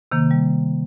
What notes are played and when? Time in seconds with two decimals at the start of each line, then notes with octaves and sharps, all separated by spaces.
0.12 C3 D#3 A#3
0.31 G3